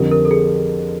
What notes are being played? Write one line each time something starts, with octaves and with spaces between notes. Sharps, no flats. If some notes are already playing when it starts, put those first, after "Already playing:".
Already playing: F2 D3 G3 C4 D#4 A#4
A#4
A4
G#4